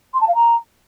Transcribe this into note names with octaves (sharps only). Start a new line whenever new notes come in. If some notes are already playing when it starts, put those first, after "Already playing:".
C6
A5
F5
A#5